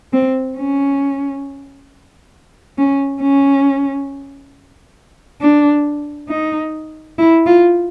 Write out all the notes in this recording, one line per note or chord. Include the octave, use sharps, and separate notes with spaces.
C4
C#4
C#4
C#4
D4
D#4
E4
F4